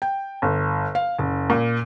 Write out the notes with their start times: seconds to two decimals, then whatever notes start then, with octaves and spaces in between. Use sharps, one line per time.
0.02 G5
0.42 G1
0.95 F5
1.19 F#1
1.50 A#2